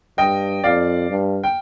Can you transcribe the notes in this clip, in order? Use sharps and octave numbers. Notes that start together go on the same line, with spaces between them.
G2 D#5 G5
F2 D5 F5
G2
G5